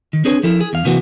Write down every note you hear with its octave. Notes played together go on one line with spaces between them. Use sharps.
D#3
C4 D4 G#4 B4 C#5
F3 E4 A4 A#4
G#4
E2 F5
C3 E3 F#3 A#3 B3 F#4